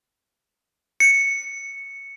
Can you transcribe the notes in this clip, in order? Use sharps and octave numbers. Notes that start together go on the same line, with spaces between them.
C#7